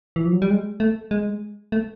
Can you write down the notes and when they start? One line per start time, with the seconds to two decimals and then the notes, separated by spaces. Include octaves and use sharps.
0.16 E3
0.26 F3
0.33 F#3
0.42 G3
0.50 G#3
0.80 A3
1.11 G#3
1.72 A3